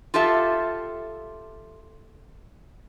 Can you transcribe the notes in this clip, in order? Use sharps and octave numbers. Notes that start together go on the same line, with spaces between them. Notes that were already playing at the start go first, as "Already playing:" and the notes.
F4 G4 A4 E5 F5